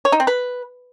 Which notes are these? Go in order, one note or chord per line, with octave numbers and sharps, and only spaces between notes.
C#5
D#4
C4
B4